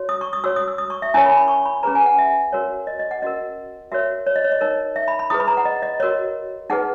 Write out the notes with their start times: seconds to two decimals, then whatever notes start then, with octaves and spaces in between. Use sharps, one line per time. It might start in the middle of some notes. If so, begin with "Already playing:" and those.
Already playing: F#4 C#5
0.09 D#6
0.21 C#6
0.33 D#6
0.44 F#4 C#5 E6
0.56 D#6
0.68 E6
0.78 D#6
0.90 C#6
1.02 E5
1.14 C#4 E4 A#4 C#5 G#5
1.26 B5
1.37 B5
1.48 C#6
1.66 B5
1.83 C#4 G#4 B4 A#5
1.95 G#5
2.06 F#5
2.18 E5
2.53 F#4 A#4 C#5
2.87 D#5
2.99 D#5
3.11 F#5
3.22 C#4 F#4 A#4 D#5
3.92 F#4 A#4 C#5 E5
4.26 C#5
4.36 D#5
4.44 C#5
4.52 D#5
4.61 D#4 A#4 C#5
4.96 E5
5.08 B5
5.19 B5
5.30 E4 G#4 B4 D#6
5.40 B5
5.48 A#5
5.57 F#5
5.65 D#5
5.83 D#5
6.00 F#4 A#4 C#5 D#5
6.70 D#4 G#4 B4 F#5